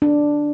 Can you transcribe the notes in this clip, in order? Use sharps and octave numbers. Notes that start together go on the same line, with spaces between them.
D4